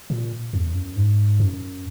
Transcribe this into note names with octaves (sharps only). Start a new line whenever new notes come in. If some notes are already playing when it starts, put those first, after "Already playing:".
A#2
E2
F#2
G#2
F#2